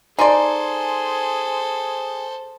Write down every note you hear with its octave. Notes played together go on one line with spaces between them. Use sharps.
D#4 G#4 A4 C5 D5 G#5 C6